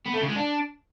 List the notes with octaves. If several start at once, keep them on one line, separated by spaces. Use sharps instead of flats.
B3
A3
C#3
G#3
D4